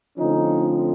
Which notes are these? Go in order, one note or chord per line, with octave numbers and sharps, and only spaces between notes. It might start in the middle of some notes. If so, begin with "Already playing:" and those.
D3 F3 A3 C4 C#4 D#4